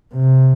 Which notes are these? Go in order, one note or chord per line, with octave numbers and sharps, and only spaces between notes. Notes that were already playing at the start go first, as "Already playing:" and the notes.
C3